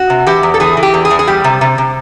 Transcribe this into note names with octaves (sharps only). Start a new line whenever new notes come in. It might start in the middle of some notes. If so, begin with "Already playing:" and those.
Already playing: F#4
C3
E3 G4
E2
A4
E3 G#4
E3
G4
E2
G#4
E2
G#4
G3 G4
C3
C3
C3